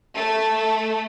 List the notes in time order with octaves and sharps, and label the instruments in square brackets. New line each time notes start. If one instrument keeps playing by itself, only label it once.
[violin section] A3